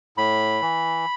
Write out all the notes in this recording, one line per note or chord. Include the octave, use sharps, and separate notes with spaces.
A2 B5
E3